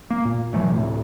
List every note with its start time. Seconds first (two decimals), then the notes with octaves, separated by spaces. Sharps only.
0.10 A#3
0.25 A#2
0.54 B2 E3 F#3 A3
0.71 D2 A2 C3